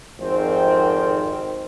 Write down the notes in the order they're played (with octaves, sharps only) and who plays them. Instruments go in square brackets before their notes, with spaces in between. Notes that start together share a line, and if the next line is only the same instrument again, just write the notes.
[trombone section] G#1 F2 D#3 C4